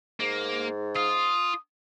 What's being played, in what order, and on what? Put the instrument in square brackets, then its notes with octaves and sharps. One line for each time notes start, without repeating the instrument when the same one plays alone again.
[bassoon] G#2 [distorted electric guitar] A#3
[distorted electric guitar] F4 [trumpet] D#6